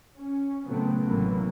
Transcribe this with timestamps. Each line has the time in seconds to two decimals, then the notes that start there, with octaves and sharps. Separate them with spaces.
0.16 C#4
0.65 A#2 C#3 F#3 A3 B3 C4
1.05 A1 C3 E3 F#3 A#3 B3